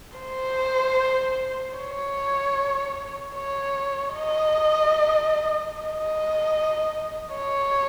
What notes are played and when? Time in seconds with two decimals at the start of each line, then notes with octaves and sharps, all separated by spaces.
0.18 C5
1.77 C#5
3.36 C#5
4.15 D#5
5.74 D#5
7.35 C#5